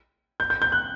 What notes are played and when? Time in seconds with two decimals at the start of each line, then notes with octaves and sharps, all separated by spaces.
0.40 G6
0.50 G6
0.62 G6
0.72 F#6